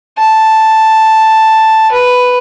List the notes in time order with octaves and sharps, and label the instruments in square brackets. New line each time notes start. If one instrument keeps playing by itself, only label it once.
[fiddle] A5
B4